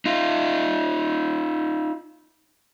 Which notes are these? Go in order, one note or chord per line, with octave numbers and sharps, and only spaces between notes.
D#4 F4